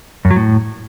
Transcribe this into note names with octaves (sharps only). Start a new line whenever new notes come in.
F#2
F#3
A2